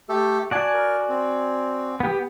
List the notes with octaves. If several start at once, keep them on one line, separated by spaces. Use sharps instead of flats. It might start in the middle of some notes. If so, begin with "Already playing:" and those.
A3 G4 A4
F#4 D5 G#5 A5
A#4
C4
B3 G4